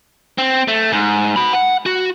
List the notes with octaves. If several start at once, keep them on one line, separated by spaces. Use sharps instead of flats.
C4
A3
G#2
F#4 B5
F#5
F#4